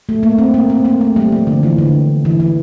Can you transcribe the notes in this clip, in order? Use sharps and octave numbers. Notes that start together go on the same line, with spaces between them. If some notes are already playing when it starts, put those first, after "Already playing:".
A3
A#3
C4
A#3
C4
A#3
A3
G3
F3
D3
E3
D3
E3
E3